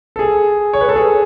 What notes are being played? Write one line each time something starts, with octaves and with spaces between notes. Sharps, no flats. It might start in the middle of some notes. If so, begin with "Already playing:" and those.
A4
G#4
C#5
B4
A4
G#4